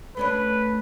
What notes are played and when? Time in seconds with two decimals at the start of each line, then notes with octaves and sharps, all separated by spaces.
0.17 A3 C#4 D4 B4